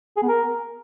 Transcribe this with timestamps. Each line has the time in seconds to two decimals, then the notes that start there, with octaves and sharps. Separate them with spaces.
0.17 G#4
0.23 B3
0.28 A#4